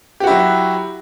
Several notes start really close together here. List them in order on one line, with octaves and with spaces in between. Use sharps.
G4 F#4 E4 F#3